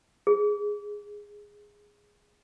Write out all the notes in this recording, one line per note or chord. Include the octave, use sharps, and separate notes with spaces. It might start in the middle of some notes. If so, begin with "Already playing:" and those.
G#4